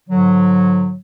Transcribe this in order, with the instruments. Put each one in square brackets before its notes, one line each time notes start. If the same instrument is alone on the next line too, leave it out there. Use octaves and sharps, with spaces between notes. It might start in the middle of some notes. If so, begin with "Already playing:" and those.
[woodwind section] G#2 D3 F#3